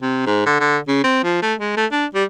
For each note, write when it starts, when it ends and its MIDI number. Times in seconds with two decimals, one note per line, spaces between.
0.02 0.24 48
0.26 0.43 44
0.46 0.58 50
0.60 0.78 50
0.88 1.01 49
1.04 1.23 60
1.24 1.41 53
1.42 1.54 57
1.60 1.75 56
1.77 1.86 57
1.92 2.06 62
2.15 2.24 55